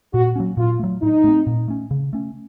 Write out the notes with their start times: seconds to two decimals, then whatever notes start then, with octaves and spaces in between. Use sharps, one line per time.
0.13 A#2 F#4
0.36 F#3 A#3 C#4
0.57 A#2 F4
0.79 F#3 A3
1.02 A2 D#4
1.24 A3 C4
1.47 A#2
1.68 A3 C#4
1.91 C#3
2.13 A3 C#4